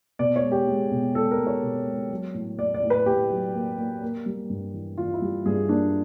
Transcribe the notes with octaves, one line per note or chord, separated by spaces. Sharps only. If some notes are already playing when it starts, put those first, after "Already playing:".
B2 D5
C#5
G#3
G4
G#3
B2
G#3 A4
A#4
G#3
C#5
B2
G#3
F#3
A2
A2 D5
D5
A2
B4
A2 G4
F#3
A#3
A#3
A#3
G3
G2
E3
E3 F4
E4
G3
G2 G#4
A#3 D4